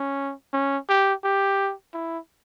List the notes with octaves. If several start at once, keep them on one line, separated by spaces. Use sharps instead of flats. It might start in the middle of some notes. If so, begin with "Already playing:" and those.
Already playing: C#4
C#4
G4
G4
E4